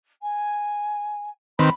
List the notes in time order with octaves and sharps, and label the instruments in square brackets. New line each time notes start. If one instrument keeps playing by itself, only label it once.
[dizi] G#5
[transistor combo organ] D#3 C4 B4 [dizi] B5